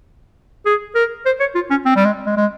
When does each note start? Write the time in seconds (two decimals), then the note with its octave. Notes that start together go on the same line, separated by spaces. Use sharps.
0.66 G#4
0.95 A#4
1.26 C5
1.40 C#5
1.55 F4
1.70 C#4
1.85 C4
1.96 G3
2.05 G#3
2.26 G#3
2.37 G#3